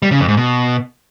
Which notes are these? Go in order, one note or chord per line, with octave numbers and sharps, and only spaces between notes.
G3
C#3
F2
G#2
B2